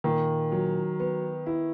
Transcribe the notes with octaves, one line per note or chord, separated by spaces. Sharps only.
A#2 D#3
F#3
B3
E4